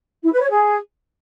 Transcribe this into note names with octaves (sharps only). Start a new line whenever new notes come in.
E4
B4
C#5
G#4